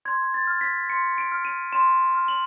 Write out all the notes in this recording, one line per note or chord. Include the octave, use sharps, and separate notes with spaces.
C6 G#6
A6
F6
B6
C6 C#7
D7
F6
D#7
C6 E7
F6
F#7